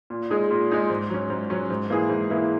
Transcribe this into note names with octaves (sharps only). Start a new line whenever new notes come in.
A#2
G#3 D#4 G#4
A#2
G#3 D#4 G#4
G#2
F#3 C#4
G#2
F#3 C#4
G#2
E3 A#3 E4 G#4
G#2
E3 A#3 E4 G#4